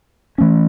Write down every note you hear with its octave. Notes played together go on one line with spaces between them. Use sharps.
E3 A3 C#4